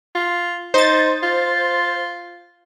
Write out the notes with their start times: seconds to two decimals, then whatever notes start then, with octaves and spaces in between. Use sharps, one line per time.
0.15 F4
0.74 D#4 C5 A6
1.23 F4